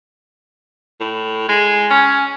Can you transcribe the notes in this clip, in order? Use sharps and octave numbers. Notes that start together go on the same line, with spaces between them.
A2
G#3
C#4